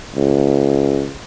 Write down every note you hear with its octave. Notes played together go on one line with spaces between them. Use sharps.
C#2